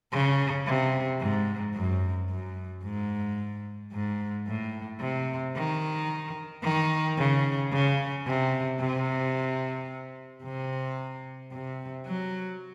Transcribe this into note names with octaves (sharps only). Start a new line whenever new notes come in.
C#3
C3
G#2
F#2
F#2
G#2
G#2
A2
C3
D#3
D#3
C#3
C#3
C3
C3
C3
C3
F#3